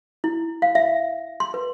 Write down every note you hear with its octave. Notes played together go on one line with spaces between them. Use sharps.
E4
F5
E5
C6
B4